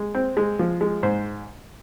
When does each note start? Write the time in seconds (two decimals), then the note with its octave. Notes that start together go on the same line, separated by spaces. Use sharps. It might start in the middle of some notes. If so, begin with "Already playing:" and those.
Already playing: G#3
0.15 C4
0.37 G#3
0.59 F3
0.81 G#3
1.03 G#2 C5